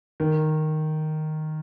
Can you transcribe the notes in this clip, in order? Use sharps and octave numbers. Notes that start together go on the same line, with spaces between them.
D#3